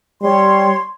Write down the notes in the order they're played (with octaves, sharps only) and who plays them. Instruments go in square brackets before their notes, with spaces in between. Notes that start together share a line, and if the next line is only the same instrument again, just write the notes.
[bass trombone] G3 [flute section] C#5 C6